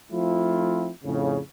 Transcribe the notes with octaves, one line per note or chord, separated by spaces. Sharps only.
F3 A3 C4 E4 F4
F2 A2 C#3